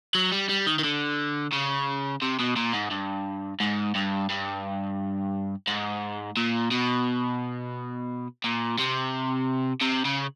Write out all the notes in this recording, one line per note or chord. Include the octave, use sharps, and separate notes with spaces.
F#3
G3
G3
D#3
D#3
D3
C#3
C3
B2
A#2
G#2
G2
G#2
G2
G2
G#2
A#2
B2
A#2
C3
C3
C#3